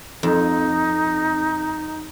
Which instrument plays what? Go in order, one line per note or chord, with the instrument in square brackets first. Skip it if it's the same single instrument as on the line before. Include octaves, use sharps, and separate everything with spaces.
[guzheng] F2 [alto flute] D#4